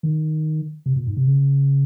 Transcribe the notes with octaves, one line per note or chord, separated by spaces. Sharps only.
D#3
C3
A#2
G#2
C3
C#3